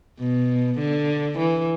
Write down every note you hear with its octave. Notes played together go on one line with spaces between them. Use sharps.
B2
D3
E3